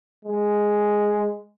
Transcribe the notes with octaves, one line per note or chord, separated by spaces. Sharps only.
G#3